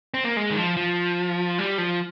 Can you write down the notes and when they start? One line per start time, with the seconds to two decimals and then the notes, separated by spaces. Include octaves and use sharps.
0.14 C4
0.24 A#3
0.37 G#3
0.51 D#3
0.57 F3
0.77 F3
1.59 G3
1.78 F3